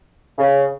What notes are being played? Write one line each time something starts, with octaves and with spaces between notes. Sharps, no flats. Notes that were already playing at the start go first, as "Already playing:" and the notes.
C#3